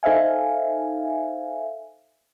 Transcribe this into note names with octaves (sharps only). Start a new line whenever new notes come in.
D#4 A4 C5 E5 F5 G#5